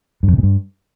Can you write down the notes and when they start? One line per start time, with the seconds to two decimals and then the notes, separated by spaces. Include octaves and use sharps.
0.23 G2
0.28 F2
0.33 C3
0.38 A#2
0.43 G2